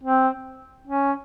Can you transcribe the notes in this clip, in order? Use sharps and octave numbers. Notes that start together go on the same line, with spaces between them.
C4
C#4